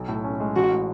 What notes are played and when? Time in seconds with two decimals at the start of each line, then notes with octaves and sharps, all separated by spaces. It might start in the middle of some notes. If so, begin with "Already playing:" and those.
Already playing: B1
0.08 A2
0.24 C#4
0.40 G#3
0.56 A1 F#4
0.71 A2